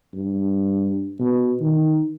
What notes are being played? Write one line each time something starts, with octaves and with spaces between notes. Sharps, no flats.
G2
B2
D#3